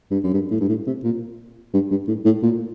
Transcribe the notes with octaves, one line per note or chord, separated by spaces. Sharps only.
G2
F#2
G2
A2
G2
A2
C3
A#2
G2
G2
A2
A2
A#2